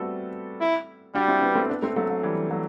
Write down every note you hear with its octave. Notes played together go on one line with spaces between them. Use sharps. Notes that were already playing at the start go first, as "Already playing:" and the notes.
Already playing: G3 A3 B3 C4 F#4 A4
E4
G3 D4 F#4
C4 E4
B3 D4
A3 C4
B3 D4
A3 C4
F#3 A3
F#3
E3 G3
F#3 A3